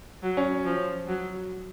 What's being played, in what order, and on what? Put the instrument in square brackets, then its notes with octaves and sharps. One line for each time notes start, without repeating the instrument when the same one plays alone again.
[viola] F#3
[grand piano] C#4
[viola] F3
F#3